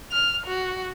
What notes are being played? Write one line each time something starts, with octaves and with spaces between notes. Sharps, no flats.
F6
F#4